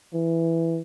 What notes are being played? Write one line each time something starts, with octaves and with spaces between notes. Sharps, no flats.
E3